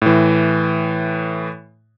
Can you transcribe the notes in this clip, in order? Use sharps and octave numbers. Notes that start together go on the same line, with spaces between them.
A2 E3